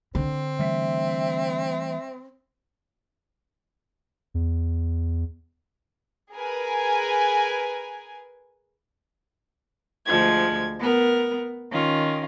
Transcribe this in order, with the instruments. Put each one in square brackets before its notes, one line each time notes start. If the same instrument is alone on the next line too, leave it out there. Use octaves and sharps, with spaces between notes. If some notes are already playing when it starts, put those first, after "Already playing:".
[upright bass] D3 [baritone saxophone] C4
[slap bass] E3 G3 A3 [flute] E5
[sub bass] E2
[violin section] G#4 A#4 B4 G#5
[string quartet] D2 F3 G#3 G#6
B3 A#4
D#3 C#4 F4